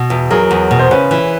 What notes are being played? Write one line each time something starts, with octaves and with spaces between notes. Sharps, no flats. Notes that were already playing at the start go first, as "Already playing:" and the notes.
Already playing: B2
E2
F#3 G#4 A#4
E2
B2
C5
C#3 B4 C#5
E3